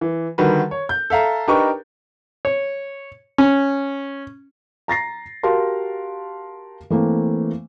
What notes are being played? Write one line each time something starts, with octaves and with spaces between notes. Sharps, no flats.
E3
D3 D#3 G3 F#4 B4
C#5
G6
A4 E5 F5 A#5
D4 D#4 G4 A#4 B4 C#6
C#5
C#4
A#5 A6 A#6 C7
F#4 G4 A#4 F5 A5 C6
E3 A3 A#3 C4